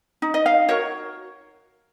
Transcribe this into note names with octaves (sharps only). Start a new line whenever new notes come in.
D#4
D#5
F5
F#4 A#4 C#5